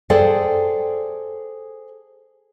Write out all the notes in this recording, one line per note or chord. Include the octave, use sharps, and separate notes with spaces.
G#4 A4 C5 D5 G5